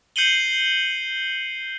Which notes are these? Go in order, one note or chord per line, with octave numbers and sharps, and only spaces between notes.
G6 C7 C#7 D#7 F#7 G7